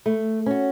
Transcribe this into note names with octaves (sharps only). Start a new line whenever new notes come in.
A3
C#4 F#4